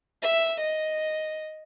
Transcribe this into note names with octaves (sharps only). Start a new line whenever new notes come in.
E5
D#5